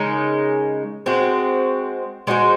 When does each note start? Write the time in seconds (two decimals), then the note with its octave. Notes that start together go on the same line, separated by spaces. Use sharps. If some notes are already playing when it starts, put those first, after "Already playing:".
Already playing: C#3 G#3 D#4 A#4
1.06 G#3 C4 F#4
2.27 G#3 D#4 F#4 C5